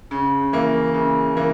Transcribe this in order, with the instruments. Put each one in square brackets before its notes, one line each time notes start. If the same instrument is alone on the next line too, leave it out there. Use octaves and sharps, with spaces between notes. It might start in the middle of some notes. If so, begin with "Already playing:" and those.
[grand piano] C#3
E3 A#3
C#3
E3 A#3